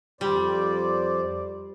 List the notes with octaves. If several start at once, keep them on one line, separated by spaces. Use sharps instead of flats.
F2 G3 C5 D5